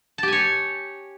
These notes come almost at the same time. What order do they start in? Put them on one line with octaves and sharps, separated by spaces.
A5 G4 G#5 C#5